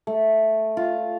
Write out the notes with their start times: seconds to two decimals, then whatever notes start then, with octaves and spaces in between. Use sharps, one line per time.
0.07 A3
0.77 F4